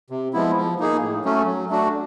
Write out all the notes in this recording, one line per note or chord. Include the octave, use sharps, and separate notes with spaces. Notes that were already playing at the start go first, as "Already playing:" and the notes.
C3
F3 G#3 B3 E4
F3
A#3 D#4 G#4
A2
F#3 A3 C#4
F#3
A3 D4 F#4